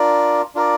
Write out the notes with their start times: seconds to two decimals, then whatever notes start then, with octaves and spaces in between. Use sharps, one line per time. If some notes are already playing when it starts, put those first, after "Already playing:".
Already playing: D4 F4 A#4 D5
0.55 D4 F4 A#4 D5